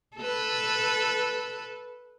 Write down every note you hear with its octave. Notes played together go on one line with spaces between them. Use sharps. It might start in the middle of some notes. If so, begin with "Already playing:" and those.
A4 B4